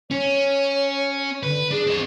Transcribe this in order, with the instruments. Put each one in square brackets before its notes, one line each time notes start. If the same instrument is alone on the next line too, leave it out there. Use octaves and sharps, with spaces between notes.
[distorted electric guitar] C#4 [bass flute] C#5
[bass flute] D3 [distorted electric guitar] B4
[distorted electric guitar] D4 [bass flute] G#4
[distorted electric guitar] C4 D#5